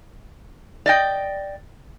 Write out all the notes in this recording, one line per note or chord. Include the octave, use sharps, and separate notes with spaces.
D5 D#5 G5